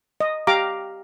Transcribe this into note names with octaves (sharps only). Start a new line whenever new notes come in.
D#5
G4 F5 A#5 D6